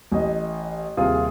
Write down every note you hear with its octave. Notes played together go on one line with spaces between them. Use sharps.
A1 D#5
D#1 C3 F4 G#4 D#6